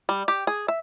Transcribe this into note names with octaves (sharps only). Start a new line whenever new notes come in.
G3
G4
G#4
E5